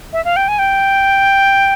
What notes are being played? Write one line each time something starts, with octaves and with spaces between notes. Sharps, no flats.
E5
F5
G5
G#5
G5